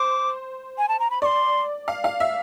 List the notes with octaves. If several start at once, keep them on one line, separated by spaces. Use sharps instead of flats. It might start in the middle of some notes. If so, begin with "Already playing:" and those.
Already playing: C5 D6
G#5
A5
A#5
B5
D5 C6 C#6
F5
F5
E5